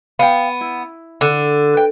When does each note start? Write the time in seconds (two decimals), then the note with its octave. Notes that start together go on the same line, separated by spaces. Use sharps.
0.19 B3 F5 G5
0.61 E4
1.21 D3
1.74 B4 G5